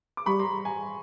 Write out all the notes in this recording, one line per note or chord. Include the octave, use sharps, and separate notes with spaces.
D6
G3 B5 C#6
A#5 C6
G#5 A#5